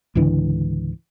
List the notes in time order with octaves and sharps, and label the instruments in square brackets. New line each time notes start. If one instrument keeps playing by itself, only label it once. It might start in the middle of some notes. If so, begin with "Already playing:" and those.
[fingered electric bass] C#2 G#2 D3 E3